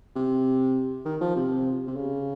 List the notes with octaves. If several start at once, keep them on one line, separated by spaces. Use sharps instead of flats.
C3
D#3
F3
C3
C3
C#3